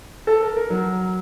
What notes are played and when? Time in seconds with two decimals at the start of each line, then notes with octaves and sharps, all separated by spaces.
0.27 A4
0.42 A#4
0.57 A#4
0.70 F#3